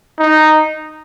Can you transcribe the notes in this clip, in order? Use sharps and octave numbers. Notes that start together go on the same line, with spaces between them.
D#4